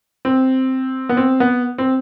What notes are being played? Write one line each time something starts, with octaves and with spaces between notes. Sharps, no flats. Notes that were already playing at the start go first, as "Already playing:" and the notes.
C4
B3
C4
B3
C4